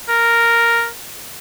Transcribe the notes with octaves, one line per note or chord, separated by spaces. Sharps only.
A#4